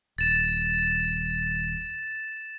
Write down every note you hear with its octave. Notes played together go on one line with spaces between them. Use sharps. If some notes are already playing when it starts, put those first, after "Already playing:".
D#1 A6 E7